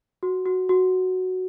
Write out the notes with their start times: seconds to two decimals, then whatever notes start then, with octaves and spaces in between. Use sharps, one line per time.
0.23 F#4
0.46 F#4
0.69 F#4